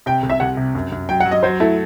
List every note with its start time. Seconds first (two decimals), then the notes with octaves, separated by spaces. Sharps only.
0.06 C3 G5
0.23 C2
0.30 E5
0.40 C2 F#5
0.57 C3
0.75 F#2
0.92 F#2
1.09 F#3 G5
1.20 F#5
1.25 F#3
1.31 D#5
1.43 F#3 C5
1.60 A3 E4